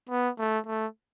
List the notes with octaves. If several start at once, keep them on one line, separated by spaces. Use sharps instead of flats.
B3
A3
A3